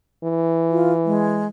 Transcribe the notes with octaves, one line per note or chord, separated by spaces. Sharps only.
E3
F4
G#3